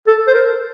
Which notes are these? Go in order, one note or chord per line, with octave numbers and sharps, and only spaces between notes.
A4
C5
A#4